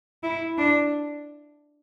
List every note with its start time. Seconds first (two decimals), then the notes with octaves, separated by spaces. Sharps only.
0.23 E4
0.58 D4